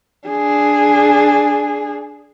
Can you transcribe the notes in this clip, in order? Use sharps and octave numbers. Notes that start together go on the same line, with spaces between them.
D4 G#4